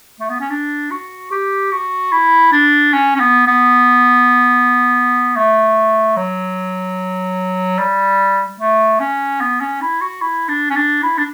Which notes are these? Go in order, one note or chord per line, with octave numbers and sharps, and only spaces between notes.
A3
B3
C#4
D4
F#4
G4
F#4
E4
D4
C#4
C#4
B3
B3
A3
F#3
G3
A3
C#4
B3
C#4
E4
F#4
E4
D4
C#4
D4
E4
D4